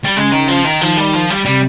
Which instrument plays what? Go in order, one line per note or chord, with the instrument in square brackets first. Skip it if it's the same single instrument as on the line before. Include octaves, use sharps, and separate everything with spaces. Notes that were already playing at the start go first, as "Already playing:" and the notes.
[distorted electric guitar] G3
[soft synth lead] C#3 [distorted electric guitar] G#3
[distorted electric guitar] D#3
F3
D#3
[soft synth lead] D#3 [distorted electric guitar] F3
[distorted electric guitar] G3
F3
G3
[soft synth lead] C3 [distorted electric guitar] G3